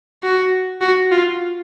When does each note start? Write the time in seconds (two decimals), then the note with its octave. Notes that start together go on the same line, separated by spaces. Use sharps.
0.23 F#4
0.81 F#4
1.11 F4